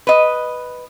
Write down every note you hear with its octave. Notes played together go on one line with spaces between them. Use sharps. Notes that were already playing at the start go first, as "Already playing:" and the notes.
B4 D#5